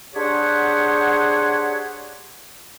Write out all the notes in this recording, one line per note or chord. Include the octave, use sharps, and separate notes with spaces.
D4 G4 G#4 C5 C#5 F#5